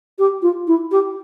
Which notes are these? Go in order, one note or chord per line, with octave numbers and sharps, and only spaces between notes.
G4
F4
E4
G4